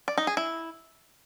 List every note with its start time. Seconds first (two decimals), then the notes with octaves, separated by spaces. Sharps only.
0.08 D5
0.17 D#4
0.27 G#4
0.37 E4